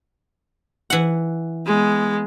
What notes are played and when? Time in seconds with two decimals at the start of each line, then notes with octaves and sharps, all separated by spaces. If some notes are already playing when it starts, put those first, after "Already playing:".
0.90 E3 F#5
1.66 G#3 B3